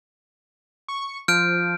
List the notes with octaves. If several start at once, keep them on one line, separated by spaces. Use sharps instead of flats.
C#6
F3 F6 G6 D7